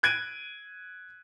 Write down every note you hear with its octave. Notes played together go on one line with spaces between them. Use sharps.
F#6 G#6 D7 D#7